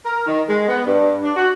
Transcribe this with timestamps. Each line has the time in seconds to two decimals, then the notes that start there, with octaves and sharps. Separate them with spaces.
0.05 A#4
0.27 D#3
0.48 G#3
0.67 B3
0.85 G2
1.23 D4
1.36 F#4